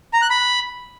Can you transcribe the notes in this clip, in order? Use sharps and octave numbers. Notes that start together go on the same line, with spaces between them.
A#5
F#6
B5